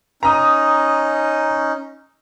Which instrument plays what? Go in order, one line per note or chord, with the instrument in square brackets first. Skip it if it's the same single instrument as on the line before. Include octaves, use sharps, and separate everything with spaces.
[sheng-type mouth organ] C#4 D#4 [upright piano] A#5 D#6